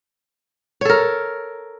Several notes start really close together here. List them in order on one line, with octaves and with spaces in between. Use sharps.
C#5 A4 A#4